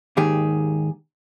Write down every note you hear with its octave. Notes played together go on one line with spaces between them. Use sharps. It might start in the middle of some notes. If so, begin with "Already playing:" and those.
D#2 G#2 D#3 G4 G#4